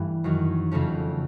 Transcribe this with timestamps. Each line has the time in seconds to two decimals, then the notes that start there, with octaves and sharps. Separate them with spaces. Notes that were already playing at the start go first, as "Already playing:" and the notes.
Already playing: G2 E3 G3 A3
0.24 F#2 D#3 F#3
0.71 F2 C#3 F#3 A3 C#4